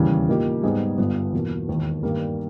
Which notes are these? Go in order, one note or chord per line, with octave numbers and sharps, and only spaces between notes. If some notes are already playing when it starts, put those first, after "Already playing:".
Already playing: E1 D#2 C#3 E3 G3
A#2 A#3 D#4 G4
G#2 G3 B3 D#4 G#4
G1 G2 G3 B3
E2 B2 A#3
E1 D#2 D#3
G2 D#3 G3 A#3